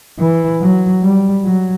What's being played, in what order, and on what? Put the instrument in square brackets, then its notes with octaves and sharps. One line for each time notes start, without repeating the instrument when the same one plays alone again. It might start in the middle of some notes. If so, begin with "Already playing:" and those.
[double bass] E3
F#3
G3
F#3